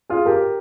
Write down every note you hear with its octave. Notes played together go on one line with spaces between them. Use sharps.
F4 G#4
G4 A#4